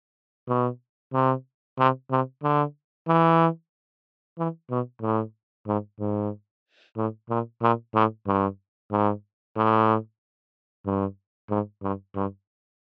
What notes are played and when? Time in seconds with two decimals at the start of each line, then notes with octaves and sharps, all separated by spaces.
0.48 B2
1.13 C3
1.79 C3
2.11 C3
2.43 D3
3.08 E3
4.38 E3
4.70 B2
5.02 A2
5.67 G#2
6.00 G#2
6.97 A2
7.30 A#2
7.62 A#2
7.94 A2
8.27 G2
8.91 G#2
9.56 A2
10.86 G2
11.50 G#2
11.82 G2
12.15 G2